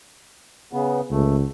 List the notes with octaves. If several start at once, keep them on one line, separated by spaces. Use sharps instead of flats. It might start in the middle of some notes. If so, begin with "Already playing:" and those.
C#3 B3
C#2 A3